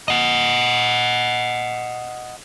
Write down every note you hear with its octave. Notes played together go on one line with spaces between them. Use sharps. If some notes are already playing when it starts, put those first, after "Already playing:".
D#5 F#5